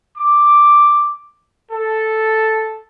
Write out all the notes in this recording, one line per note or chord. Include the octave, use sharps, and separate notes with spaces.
D6
A4